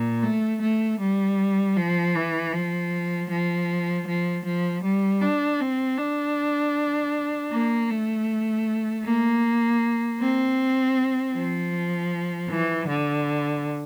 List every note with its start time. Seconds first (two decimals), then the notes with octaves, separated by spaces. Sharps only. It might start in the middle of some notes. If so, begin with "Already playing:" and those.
Already playing: A#2
0.23 A3
0.62 A3
1.00 G3
1.77 F3
2.15 E3
2.53 F3
3.30 F3
4.07 F3
4.45 F3
4.83 G3
5.22 D4
5.60 C4
5.98 D4
7.52 A#3
7.90 A3
9.05 A#3
10.20 C4
11.35 F3
12.50 E3
12.88 D3